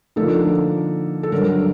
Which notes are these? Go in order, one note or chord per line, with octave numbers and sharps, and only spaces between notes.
D3 F3 A#3 D#4 A4
A4
G2 D3 F#3 A#4